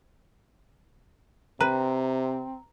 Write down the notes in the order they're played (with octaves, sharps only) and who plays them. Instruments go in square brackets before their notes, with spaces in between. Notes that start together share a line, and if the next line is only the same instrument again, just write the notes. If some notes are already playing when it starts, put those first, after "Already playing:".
[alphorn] C3 [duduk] C4 [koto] B4 [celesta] A#5